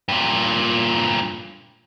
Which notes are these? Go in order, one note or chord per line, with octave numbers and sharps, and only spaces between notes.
G2 A#2